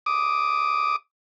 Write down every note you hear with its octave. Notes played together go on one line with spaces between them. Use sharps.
D6 D#6